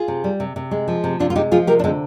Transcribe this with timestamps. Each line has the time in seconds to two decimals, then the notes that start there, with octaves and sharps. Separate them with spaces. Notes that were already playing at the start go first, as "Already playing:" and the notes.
Already playing: F4 G#4
0.08 C3
0.24 G3
0.40 C3
0.56 C3
0.71 G#3
0.88 F3
1.04 C3
1.20 C3 D4 F4
1.30 F4
1.36 G#3 D#4 G4
1.52 F3 F4 G#4
1.67 C3 G4 A#4
1.79 D4
1.84 D3 G#3 C4